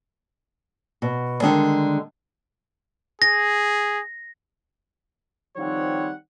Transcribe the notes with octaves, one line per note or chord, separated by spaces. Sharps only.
B2
D3 D#3 G3 G#3
G#4 A#6
D#3 F3 G3 C4 C#5 F#5